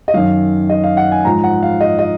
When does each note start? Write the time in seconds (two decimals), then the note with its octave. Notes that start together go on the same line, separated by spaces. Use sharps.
0.08 D#5
0.14 F#2 D#3 F#3 F5
0.69 D#5
0.84 F5
0.97 F#5
1.12 G#5
1.25 G#2 F3 A#5
1.44 F#5
1.63 F5
1.81 D#5
1.99 D#5